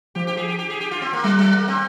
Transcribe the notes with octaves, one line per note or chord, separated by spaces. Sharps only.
F3 G4
G4
G#4
G4
G4
G#4
G4
F4
C4
A#3
G3 G#3
G#3
A#3
C4